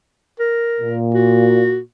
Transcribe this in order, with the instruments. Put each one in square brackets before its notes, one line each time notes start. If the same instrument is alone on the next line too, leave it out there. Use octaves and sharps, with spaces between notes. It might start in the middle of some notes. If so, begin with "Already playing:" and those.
[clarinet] A#4
[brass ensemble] A#2
[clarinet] F#4